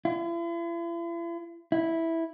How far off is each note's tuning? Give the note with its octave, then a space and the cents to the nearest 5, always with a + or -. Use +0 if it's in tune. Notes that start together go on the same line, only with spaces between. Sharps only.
E4 +45
E4 -5